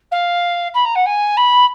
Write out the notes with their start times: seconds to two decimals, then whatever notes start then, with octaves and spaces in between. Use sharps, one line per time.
0.11 F5
0.74 B5
0.85 A#5
0.95 F#5
1.05 G#5
1.37 B5